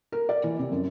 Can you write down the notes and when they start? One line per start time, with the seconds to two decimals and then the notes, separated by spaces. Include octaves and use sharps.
0.12 A#4
0.29 D5
0.44 E3
0.59 C3
0.72 F#2